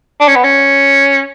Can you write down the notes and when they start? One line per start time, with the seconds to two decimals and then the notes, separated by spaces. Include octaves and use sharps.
0.20 D4
0.28 C#4
0.35 B3
0.44 C#4